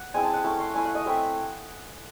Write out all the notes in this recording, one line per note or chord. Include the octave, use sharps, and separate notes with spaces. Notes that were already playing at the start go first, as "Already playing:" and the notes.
Already playing: F#5
G#3 C4 E4 G#5
A5
F#5
A3 C#4 E4 A5
C6
A3 C#4 E4 G#5
F#5
D#5
A3 C4 E4 E5